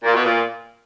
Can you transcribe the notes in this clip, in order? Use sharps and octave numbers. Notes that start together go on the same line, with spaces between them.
A#2
B2
A#2